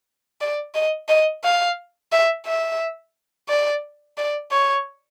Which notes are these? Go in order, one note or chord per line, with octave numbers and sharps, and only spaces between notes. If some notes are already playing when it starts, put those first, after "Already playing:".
D5
D#5
D#5
F5
E5
E5
D5
D5
C#5